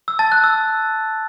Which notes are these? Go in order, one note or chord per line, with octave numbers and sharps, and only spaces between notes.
E6
A5 A6
F#6
E6